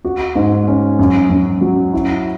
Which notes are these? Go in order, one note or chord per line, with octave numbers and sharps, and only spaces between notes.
F#4
G#2
C#4
F#2
F#2
F#3
E4